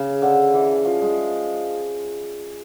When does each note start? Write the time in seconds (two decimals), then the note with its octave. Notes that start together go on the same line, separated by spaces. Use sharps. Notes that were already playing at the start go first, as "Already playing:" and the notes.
Already playing: C#3
0.22 D3
0.54 E3
0.85 F3
1.01 G#3